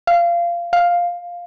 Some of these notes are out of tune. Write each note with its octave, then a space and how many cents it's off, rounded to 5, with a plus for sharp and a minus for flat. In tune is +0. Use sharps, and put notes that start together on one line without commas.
F5 -20
F5 +5